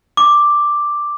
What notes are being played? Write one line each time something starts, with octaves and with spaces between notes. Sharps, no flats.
D6